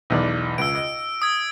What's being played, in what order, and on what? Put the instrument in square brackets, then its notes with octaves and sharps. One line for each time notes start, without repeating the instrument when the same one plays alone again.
[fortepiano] B1 E2 D5
[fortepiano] C#2 [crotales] E6 D7
[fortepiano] D#5
[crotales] D#6 G#6